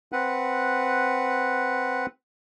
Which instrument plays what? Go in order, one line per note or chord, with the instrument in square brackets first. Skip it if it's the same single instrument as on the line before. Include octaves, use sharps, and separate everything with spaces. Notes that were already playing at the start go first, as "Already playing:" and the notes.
[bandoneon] C4 B4 F#5